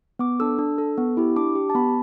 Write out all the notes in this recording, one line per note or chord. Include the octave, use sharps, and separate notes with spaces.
B3 D6
D4 A4 E6
D4
A4
B3
E4 G4
D4 D6
G4
A5
B3 B5